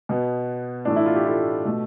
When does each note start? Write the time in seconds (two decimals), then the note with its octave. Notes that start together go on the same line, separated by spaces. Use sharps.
0.09 B2 B3
0.85 A2 E3 A3 D4
0.96 E4
1.06 F4
1.15 G4
1.26 F4 A4
1.65 B2 A3